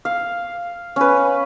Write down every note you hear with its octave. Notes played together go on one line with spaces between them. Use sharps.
F5
C#4 B4